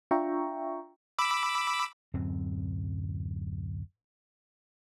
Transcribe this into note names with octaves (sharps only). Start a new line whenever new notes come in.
D4 F4 E5 G5 A#5 C#6
B5 D6 E6
D1 F#2 C4